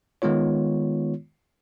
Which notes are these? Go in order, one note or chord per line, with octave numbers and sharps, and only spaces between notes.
D#3 G#3 B3 F4 C#5